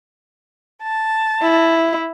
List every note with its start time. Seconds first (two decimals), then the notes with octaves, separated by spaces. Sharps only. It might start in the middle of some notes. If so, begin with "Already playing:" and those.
0.82 A5
1.43 E4